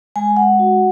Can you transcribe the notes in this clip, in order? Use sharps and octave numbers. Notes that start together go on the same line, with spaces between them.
G#3 G#5
G#3 F#5
F#4